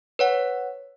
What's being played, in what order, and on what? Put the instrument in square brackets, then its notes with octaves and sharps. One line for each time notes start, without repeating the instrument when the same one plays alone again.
[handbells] B4 C#5 F#5